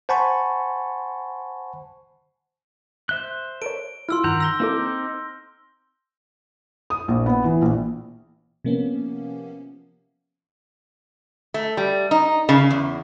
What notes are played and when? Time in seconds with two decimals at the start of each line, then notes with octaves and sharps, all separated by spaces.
0.09 C5 F#5 G#5 A5 B5 C#6
3.09 C5 E5 F#6 G7
3.62 A4 A#4 C#5 D7
4.09 E4 F4 C6 E6 F6
4.24 G2 D#3 F#5 A#5 G6
4.40 E6 A#6 G7
4.60 A#3 C4 D#4 E4 A4 D6
6.90 D#6
7.08 A#1
7.26 B3
7.44 E3
7.62 A#1
8.65 C3 F3 A#3 B3 C#4
11.54 A3
11.77 G3
12.11 D#4
12.49 C#3
12.70 E2